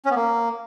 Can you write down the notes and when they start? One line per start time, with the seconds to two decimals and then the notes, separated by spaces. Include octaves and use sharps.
0.05 C#4
0.10 B3
0.15 A#3